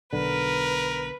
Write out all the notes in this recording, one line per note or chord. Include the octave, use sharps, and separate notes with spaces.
B1 D3 A#4 B4